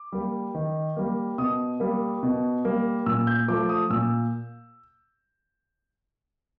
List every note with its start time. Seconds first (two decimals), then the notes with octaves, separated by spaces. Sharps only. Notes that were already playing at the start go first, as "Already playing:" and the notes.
Already playing: D6
0.12 G3 A#3
0.55 D#3
0.97 G3 A#3
1.38 B2 D#6
1.80 G3 A#3
2.23 B2
2.65 G3 A#3
3.06 A#2 E6
3.27 G6
3.48 F3 A3 D6
3.69 D#6
3.90 A#2 E6